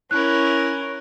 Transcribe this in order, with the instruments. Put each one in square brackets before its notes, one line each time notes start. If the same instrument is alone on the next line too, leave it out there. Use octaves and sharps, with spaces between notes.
[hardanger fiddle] C#4 A#4 [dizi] E4 [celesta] F#6